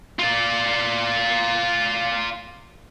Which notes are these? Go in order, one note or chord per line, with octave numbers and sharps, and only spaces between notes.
F4 D5